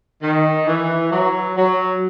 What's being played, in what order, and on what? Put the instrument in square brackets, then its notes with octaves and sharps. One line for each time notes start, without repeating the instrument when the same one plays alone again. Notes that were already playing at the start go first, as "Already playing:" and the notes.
[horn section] D#3
E3
F#3
F#3